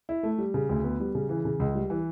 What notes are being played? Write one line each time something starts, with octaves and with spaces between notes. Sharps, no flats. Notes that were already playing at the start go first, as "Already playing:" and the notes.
E4
A3
G3
C#3
D2
B3
G3
C#3
E3
C#3
C#2
G3
E3